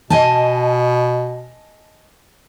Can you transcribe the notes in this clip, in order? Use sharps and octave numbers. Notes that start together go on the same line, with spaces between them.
B2 D#5 G#5 A5